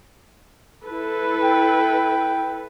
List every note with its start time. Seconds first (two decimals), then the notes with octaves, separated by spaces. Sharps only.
0.85 E4 A4 B4
1.43 G5